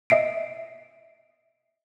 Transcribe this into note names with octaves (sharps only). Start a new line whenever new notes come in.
D#5 E5 C7 D7